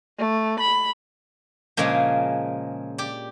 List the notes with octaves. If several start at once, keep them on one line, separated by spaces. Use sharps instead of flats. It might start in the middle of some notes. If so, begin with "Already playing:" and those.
A3
B5
A#2 C#3 F3 G#3 A#3
G4 D5